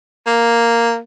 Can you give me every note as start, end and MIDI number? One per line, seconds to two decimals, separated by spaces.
0.27 0.98 58